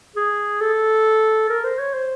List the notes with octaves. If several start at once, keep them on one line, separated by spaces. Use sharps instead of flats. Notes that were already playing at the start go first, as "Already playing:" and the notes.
G#4
A4
A#4
C5
C#5
C5